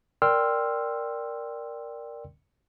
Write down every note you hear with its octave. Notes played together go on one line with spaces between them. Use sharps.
A#4 D5 G5 C6 E6 F6